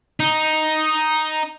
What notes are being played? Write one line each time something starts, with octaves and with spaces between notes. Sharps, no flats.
D#4